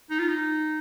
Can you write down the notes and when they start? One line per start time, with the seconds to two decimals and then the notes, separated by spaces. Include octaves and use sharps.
0.10 D#4
0.19 F4
0.28 D#4